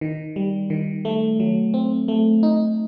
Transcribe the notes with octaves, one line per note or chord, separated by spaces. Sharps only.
D#3
G3
D#3
A3
F#3
C4
A3
D#4